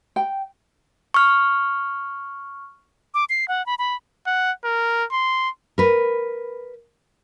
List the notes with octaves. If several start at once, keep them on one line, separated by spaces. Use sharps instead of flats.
G5
C#6 F6
D6
C7
F#5
B5
B5
F#5
A#4
C6
A#4 B4